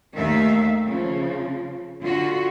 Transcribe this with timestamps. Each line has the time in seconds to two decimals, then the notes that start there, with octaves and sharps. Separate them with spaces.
0.15 D#2 D#3 A3 E5 F5
0.87 C#3 F3
2.01 D3 F4 F#4